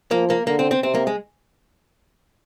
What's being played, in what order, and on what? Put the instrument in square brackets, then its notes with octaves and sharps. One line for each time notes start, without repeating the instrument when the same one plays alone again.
[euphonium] F3 [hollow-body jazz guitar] A#3
[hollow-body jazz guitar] A#3
[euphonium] D3 [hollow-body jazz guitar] A#3
[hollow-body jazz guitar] C4
C4
[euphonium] C3 [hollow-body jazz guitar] C4
[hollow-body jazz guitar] A#3
G#3